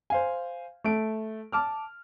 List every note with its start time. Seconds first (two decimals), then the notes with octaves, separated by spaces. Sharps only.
0.10 C5 F5 G#5
0.84 A3 D7
1.52 A5 D6 F6